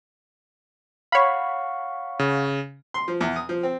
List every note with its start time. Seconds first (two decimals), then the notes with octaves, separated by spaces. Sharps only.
1.12 C#5 F5 F#5 B5 C#6
2.19 C#3
2.94 C6
3.08 F3
3.21 E2
3.36 D#6
3.49 F3
3.63 C4